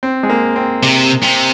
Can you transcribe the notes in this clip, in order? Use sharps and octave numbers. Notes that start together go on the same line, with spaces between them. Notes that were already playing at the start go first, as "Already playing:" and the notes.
C4
G#3
A#3
C4
C3
C3